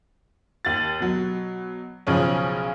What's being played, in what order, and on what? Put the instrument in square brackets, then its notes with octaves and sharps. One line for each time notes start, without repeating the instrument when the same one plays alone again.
[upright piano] D#2 A6
B2 F#3
B1 C#3 F3 C#5